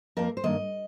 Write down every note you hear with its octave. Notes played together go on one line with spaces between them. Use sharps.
F2 F3 A#3 A#4
C5
G2 D#3 A#3 D#5